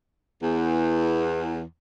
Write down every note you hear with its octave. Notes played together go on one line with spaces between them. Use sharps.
E2